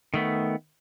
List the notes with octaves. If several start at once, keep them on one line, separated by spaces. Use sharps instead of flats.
D#3 A3 B3